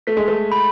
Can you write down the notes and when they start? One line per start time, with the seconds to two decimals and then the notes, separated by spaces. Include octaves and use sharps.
0.07 A3 B6
0.17 G#3
0.28 A3
0.52 B5